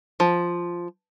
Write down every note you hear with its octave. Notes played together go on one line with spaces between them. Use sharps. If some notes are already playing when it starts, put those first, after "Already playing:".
F3